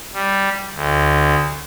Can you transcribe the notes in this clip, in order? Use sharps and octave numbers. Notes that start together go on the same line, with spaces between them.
G3
D2